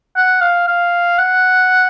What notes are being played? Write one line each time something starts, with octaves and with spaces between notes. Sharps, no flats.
F#5
F5
F5
F#5